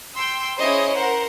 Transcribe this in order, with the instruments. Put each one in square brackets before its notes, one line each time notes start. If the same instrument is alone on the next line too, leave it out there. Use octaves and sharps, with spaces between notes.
[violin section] G5 C6 E6
C#4 E4 G#4 C5 C#5 D#5
A#4 C5 F#5